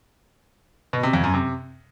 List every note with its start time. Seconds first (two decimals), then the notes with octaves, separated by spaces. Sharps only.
0.93 B2
1.03 C3
1.13 F2
1.24 F#2
1.34 C3